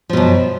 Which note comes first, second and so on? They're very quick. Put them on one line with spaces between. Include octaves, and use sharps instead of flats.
F3 B2 F#2